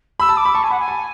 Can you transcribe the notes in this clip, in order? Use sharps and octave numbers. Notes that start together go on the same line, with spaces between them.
B5 E6
A5
D6
B5
A5 C#6
G#5
F#5 B5
G#5
A5